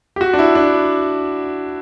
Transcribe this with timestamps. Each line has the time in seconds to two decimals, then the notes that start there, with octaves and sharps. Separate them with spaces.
0.16 G4
0.21 F#4
0.33 D4
0.39 E4
0.55 D4